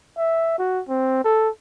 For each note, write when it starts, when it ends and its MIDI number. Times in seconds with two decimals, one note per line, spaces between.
0.17 0.55 76
0.59 0.81 66
0.89 1.23 60
1.24 1.49 69